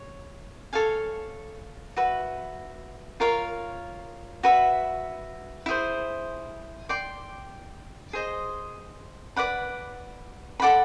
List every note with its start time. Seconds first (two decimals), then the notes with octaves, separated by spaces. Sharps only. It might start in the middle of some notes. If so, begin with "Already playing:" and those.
Already playing: C#5
0.73 A4 C#5 F5 G#5
1.96 F#4 B4 E5
3.20 F4 A#4 C#5 F5
4.43 F#4 B4 E5
5.66 E4 G#4 C5
6.89 D5 G5 C6
8.13 G#4 C5 D#5
9.36 B4 D5 F#5 B5
10.60 A4 D5 F#5 B5